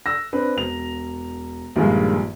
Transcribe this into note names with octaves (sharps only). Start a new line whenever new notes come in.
E6 A#6
C4 D4 B4
E1 F7
A#1 G2 D#3 F3 G#3 A#3